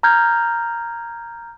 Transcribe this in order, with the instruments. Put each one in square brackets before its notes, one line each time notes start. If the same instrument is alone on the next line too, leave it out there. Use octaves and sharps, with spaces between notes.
[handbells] A#5 F6 G6 G#6